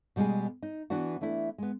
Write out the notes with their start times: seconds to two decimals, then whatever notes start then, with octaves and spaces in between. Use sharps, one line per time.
0.16 B2 G3 G#3 B3 G#4
0.62 D#4
0.90 E3 B3 D4 F#4
1.21 E3 A3 D4 E4
1.58 G#3 B3